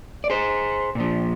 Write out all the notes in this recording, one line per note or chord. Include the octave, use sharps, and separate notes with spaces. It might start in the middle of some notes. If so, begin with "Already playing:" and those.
D5
G#4 C5
A#2 F3